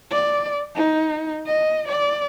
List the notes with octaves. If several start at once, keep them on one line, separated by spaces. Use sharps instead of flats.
D5
D#4
D#5
D5